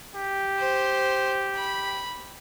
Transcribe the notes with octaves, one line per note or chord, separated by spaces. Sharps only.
G4
C5
B5